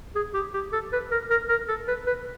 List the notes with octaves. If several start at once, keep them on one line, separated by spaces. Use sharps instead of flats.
G#4
G4
G4
A4
B4
A#4
A#4
A#4
A4
B4
B4